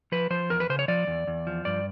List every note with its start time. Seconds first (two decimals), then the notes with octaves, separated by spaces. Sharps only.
0.12 F3 B4
0.30 F3 C5
0.50 E2 A#4
0.60 B4
0.69 C#3 C5
0.79 C#5
0.88 F3 D5
1.07 E2
1.27 E2
1.47 F3
1.65 G2 D5